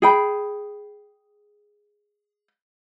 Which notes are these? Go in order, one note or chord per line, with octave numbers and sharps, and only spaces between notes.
G#4 G5 B5